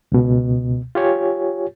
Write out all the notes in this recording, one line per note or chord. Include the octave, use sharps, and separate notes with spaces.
C#2 B2
F4 G4 C#5 G#5